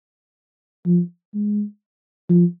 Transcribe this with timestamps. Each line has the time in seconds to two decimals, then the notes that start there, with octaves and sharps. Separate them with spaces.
0.86 F3
1.35 G#3
2.30 F3